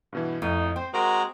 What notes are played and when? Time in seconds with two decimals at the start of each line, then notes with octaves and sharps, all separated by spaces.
0.13 G2 B2 E3
0.42 F2 A2 D#4
0.76 C4 C5 G5
0.94 G#3 F#4 A#4 C5 A#5 D7